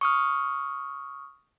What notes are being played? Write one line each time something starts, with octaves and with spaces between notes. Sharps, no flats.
C#6 D#6 F6